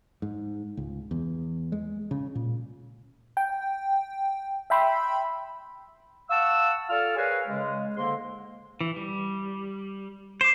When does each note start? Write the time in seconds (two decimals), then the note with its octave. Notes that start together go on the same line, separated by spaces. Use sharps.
0.22 G#2
0.77 C#2
1.11 E2
1.72 G#3
2.11 C#3
2.35 A#2
3.37 G5
4.70 E5 G5 B5 C6 E6
6.30 F5 F#5 A5 C#6 E6
6.90 F4 A4 D5 F6
7.17 G#4 A#4 B4 C#5 F5 G#5
7.47 C#3 G#3
7.96 G#2 D3 A#3 C6
8.81 E3
8.96 G3
10.41 C5 D6 C7 E7